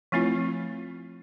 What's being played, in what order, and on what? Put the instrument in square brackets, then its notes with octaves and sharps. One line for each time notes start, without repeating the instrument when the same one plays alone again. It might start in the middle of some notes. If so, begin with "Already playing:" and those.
[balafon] F3 A3 C4 E4 F4